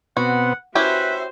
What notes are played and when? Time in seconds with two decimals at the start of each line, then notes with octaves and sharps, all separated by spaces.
0.17 B2 B3 C4 F#4 F#5
0.75 C#4 E4 F#4 G4 B4 C5 E5